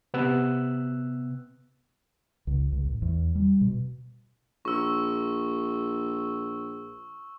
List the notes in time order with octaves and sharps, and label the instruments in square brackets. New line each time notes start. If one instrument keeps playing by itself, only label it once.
[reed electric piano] C3 B3 E6 F#6
[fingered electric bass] C#2
C#2
A1
E2
G3
B2
[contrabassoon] A#1 [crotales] C#6 E6